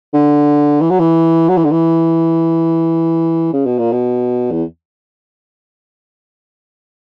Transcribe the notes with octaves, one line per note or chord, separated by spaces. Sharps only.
D3
E3
F#3
E3
F#3
E3
D3
E3
C#3
B2
A#2
B2
E2